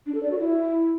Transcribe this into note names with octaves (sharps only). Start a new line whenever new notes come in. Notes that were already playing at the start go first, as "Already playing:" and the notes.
D4
A4
D5
F#4
E4